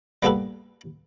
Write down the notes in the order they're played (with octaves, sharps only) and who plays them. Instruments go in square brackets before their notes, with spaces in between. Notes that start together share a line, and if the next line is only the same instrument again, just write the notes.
[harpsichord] G3 A#3 B3 G4 A4 B4